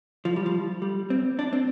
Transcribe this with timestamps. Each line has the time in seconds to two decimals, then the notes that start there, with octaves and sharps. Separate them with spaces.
0.25 F3
0.36 G3
0.46 F3
0.82 G3
1.10 C4
1.39 D4
1.53 C4